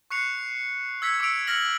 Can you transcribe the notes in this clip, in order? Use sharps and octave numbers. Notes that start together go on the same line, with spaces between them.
C#6 F#6 C7 C#7 F7
E6 G#6 B6 C#7
D6 E6 B6 C#7 D7 F7
F6 A#6 C#7 F#7